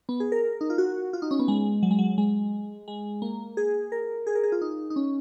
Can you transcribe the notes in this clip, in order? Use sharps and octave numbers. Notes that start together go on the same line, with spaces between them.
B3
G#4
A#4
D#4
F4
F#4
F4
D#4
C#4
B3
G#3
F#3
G#3
F#3
G#3
G#3
A#3
G#4
A#4
G#4
A#4
G#4
F4
D#4
D#4
C#4